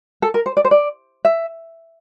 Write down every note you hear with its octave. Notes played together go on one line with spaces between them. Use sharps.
A4
A#4
C5
D5
C5
D5
E5